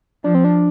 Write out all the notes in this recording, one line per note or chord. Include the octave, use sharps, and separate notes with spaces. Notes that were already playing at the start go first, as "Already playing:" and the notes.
F3 D4
C4
D4